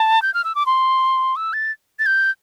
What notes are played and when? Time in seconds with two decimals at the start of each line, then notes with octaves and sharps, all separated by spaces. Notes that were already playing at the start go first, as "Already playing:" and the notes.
Already playing: A5
0.22 G6
0.34 F6
0.44 E6
0.55 D6
0.66 C6
1.36 E6
1.53 A6
1.99 A6
2.06 G6